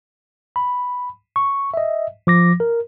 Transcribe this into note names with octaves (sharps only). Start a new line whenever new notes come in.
B5
C#6
D#5 E5
F3 D6 A#6
A#4